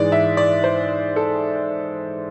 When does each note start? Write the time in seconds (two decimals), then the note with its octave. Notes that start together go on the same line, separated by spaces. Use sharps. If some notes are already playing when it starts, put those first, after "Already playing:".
Already playing: G#2 E3 G#3 D5
0.12 E5
0.37 D5
0.64 C5
1.16 A4